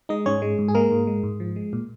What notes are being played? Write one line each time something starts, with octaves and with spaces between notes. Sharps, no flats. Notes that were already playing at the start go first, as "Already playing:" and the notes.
G#3 D#4 D#5
G#2 C#4 C#5
G#3
G#2
G#4
G#3 A#3 A#4
G#2
G#3
G#2
F3
G#3
A#2